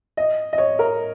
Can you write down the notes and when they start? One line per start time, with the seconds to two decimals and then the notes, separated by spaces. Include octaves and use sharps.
0.17 D#5
0.53 D#5
0.58 C#5
0.79 A#4